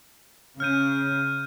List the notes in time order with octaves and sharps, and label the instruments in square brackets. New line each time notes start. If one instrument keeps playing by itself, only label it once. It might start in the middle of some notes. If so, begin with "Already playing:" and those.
[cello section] C#3 [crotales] F6 G6 D#7